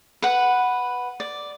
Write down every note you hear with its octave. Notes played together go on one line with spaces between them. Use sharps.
B4 F#5
D5